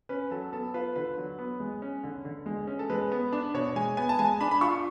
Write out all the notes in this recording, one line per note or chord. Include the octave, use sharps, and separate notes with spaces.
C#4 B4
F#3 A4
B3 A4
F4 B4
D3 B4
F#3
B3
G#3
C#4
D3
D3
G#3
C#4
A4
G#3 B4
B3
D4
B2 C#5
G#3 G#5
B3 G#5
A5
G#3 G#5
D4 B5
B5
F4 C#6